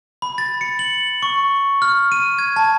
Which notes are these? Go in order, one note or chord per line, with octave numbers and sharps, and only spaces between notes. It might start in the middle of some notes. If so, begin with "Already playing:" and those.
B5
A6
C#7
F#7
C#6
F6
D#7
G#6
A5